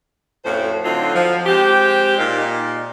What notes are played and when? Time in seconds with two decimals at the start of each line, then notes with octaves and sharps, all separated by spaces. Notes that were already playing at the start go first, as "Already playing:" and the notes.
0.45 F2 A2 C#4 F#4 C5
0.84 D3 F#3 C4 D#4 F4
1.14 F3
1.46 G#3 C4 G4
2.18 A#2 D#4